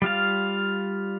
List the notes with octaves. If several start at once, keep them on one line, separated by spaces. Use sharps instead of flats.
G3 F4 F5